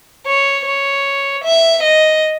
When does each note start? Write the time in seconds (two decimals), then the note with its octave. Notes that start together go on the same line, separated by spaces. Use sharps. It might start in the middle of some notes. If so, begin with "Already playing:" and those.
0.27 C#5
0.66 C#5
1.44 E5
1.83 D#5